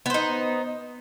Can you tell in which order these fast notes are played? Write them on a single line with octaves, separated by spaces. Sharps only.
B3 C5 D#4